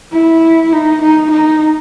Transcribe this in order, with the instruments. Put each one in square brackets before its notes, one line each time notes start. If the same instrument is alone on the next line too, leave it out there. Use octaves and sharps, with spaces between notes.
[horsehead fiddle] E4
D#4
D#4
D#4